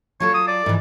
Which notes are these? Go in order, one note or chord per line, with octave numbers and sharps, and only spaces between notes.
F#3 F4 A4 C#5
D#6
D5
G#2 E3